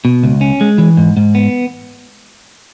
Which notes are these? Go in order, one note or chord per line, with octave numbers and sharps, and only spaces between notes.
B2
C#2
C#4
G#3
E3
G#2
G#2
B3